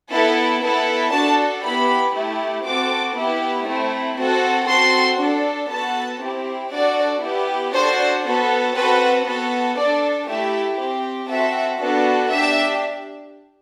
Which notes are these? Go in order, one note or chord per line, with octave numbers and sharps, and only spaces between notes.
B3 E4 A4
B3 E4 A4
D4 F#4 A4 A5
B3 E4 G4 B5
A3 E4 G4
C4 F#4 A4 D6
B3 E4 G4
A3 C4 E4
C4 F#4 A4
C4 F#4 A4 C6
D4 A4
B3 F#4 A4 A5
C4 E4 G4
D4 F#4 A4 D5
B3 E4 G4
D4 F#4 A4 C5
B3 F#4 A4
C4 F#4 A4 B4
B3 F#4 A4
D4 A4 D5
A3 E4 G4 E5
C4 G4
C4 F#4 A4 E5
B3 D4 F#4 A4
D4 G4 E5